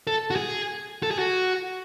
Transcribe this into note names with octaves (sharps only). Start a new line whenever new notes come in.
A4
F#4
G#4
A4
G#4
F#4